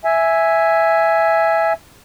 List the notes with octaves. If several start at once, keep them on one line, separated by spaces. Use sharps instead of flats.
E5 G#5